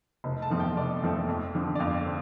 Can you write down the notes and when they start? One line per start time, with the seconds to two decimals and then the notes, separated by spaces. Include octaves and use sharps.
0.24 F1
0.42 A5
0.50 F2 F3 A3 C4
0.60 G5
0.77 F1 D5
1.02 F2 F3 A3 C4
1.28 F2
1.54 D3 F3 C4
1.75 D5
1.80 F2 F5
2.06 D3 C4